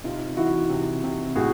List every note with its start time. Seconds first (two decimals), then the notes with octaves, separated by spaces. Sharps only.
0.04 C3 D#4 F4
0.37 E3 E4 F#4
0.69 C3
1.03 C3
1.36 A2 F#4 G#4